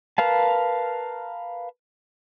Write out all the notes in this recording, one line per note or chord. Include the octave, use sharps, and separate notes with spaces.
A#4 B4 F5 A5